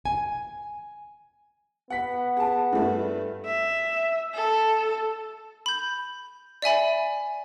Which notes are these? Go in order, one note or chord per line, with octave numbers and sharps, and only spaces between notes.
G#5
B3 F#5 B6
G#4 A5
G2 A3
E5
A4
B5 G6
D5 E5 G#5 B5